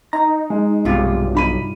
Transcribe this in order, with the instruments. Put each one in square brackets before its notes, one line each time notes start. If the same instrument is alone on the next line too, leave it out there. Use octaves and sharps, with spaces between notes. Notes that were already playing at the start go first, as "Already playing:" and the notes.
[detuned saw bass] D#4 [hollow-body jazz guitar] A#5
[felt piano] G#3
[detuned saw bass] B1 [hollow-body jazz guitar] G2 C3 F4
[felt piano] D#4 B5 D#7